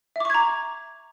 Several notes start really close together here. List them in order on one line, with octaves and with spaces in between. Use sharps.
E5 D6 C#6 G#6 A#5